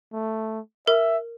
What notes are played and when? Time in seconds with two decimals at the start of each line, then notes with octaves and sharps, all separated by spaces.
0.13 A3
0.87 A#4 E5